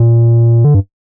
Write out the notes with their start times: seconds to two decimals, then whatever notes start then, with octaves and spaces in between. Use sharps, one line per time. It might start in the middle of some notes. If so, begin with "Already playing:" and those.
Already playing: A#2
0.65 D3
0.74 G2